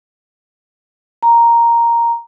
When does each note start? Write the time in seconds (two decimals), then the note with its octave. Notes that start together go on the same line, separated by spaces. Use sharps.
1.23 A#5